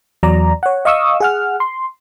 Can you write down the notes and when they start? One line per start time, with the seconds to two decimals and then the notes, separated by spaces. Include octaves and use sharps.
0.23 E2 F#3 D5 A#5
0.63 C#5 F#5
0.85 D#5 F5 C#6 D#6 E6
1.20 G#4 F#5 F6
1.60 C6